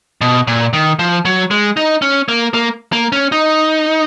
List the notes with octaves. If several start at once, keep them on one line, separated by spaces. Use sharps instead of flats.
B2
A#2
D#3
F3
F#3
G#3
D#4
C#4
A#3
A#3
A#3
C#4
D#4